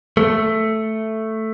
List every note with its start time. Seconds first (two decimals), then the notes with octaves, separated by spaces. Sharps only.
0.17 A3